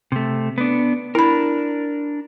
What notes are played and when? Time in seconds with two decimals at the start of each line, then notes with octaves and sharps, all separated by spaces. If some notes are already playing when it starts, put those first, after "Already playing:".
0.12 C3 A3
0.58 B3 D4
1.15 D4 E4 A#4 B5